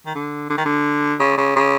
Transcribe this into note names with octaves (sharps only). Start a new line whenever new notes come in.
D#3
D3
D3
D#3
D3
C#3
C#3
C#3